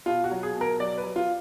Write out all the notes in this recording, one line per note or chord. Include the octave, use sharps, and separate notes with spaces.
B2 F4
F#4
F#3
G#4
B2
A#4
F#3 D5
B4
F#3
F4